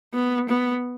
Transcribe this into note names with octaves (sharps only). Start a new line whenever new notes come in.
B3
B3